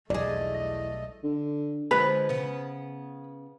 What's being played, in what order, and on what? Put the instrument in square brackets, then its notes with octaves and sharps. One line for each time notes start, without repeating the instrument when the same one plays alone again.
[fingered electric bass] B1 G3 [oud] E2 G#4 [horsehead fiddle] A3 D#5 [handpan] D5
[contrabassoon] D3
[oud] D3 F3 G#3 [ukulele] B4
[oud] C#3 B3